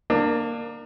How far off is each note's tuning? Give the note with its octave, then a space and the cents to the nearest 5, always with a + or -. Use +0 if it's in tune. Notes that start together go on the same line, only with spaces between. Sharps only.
A#3 +0 D4 +30